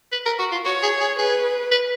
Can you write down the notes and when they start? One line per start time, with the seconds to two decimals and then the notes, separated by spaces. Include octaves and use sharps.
0.12 B4
0.26 A#4
0.39 F#4
0.52 F4
0.65 F#4 C#5
0.83 G#4
1.01 G#4
1.18 G#4 B4
1.72 B4